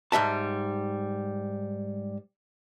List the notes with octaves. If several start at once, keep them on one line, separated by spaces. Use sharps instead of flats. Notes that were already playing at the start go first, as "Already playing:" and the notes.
G#2 G3 E5 A5